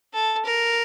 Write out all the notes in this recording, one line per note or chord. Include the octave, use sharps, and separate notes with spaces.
A4
A#4